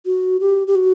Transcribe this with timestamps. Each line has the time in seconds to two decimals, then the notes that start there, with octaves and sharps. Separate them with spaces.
0.06 F#4
0.41 G4
0.68 G4
0.75 F#4